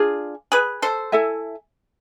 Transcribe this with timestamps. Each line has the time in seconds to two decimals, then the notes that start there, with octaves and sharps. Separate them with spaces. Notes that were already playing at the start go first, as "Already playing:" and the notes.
Already playing: D4 F4 G#4
0.52 G#4 B4
0.82 A4 C5
1.12 E4 A4 E5 G#5